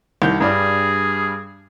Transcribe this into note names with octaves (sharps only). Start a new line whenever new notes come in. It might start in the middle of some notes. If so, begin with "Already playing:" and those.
C2 D#3 G6
G2 G3 D4 G#4